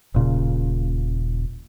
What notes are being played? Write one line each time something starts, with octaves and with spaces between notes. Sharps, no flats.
D#1 A#2 C#3